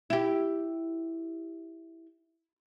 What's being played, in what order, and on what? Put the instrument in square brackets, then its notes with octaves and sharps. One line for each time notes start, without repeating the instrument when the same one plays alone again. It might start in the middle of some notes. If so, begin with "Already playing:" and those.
[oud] E4 G4